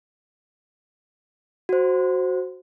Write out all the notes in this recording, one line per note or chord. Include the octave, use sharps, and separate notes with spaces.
F#4 C5